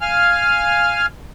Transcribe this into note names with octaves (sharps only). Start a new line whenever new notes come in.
F5 G#5 F6